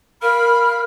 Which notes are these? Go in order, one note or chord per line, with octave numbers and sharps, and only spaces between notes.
A#4 F5 B5 F6